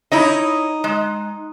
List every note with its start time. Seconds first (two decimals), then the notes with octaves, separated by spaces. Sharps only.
0.12 D#4 E4 C#5 D#5
0.84 G#3